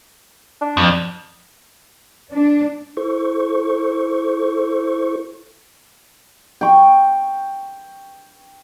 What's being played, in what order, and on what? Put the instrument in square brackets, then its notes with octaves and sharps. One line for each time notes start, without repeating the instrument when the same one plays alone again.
[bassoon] D4
[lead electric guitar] F2
[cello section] D4
[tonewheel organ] E4 A4 C5 C#6
[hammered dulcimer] G5 C#6